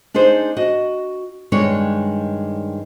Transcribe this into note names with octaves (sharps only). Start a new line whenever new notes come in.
D4 D#4 G#4 C5
F#4 D#5
G2 D#3 G#3 D4 C#5